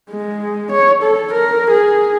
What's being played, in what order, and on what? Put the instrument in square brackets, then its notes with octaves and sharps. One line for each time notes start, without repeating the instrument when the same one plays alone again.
[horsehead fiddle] G#3
C#5
A4
A#4
G#4